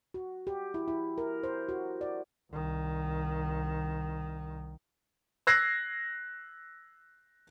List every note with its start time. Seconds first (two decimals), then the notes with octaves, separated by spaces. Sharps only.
0.14 F#4
0.47 G4
0.74 E4
0.88 E4
1.18 A#4
1.44 C5
1.69 F#4
2.01 D5
2.51 C2 D#3
5.47 E6 F#6 G#6 A#6 C7